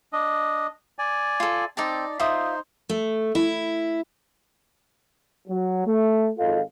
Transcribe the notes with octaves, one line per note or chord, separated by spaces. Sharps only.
D4 D#5
D5 G#5
F4 A4
C4 D#4 D5 A5
D#4 F4 C5 E5 D#6
A3
E4
F#3
A3
G#1 F4 A4 D#5 F5